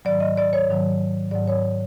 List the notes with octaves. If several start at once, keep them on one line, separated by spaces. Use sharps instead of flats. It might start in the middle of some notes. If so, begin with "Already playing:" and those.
G#2 D#3 F#3 D5
D#5
D5
C#5
G#2 D#3 F#3
G#2 D#3 F#3 D5
C#5